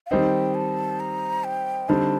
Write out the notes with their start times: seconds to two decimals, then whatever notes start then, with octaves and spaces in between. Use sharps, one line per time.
0.06 F5
0.10 D#3 G3 C4 D#4 G5
0.55 A5
1.00 A#5
1.44 G5
1.88 D3 G3 C4 D#4 A5